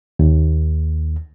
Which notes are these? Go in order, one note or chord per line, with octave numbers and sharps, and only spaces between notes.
D#2